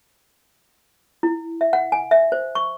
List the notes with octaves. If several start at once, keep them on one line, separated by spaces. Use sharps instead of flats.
E4
E5
F#5
G#5
E5
C5
C#6